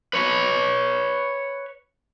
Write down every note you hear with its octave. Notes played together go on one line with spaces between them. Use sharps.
B4 C#5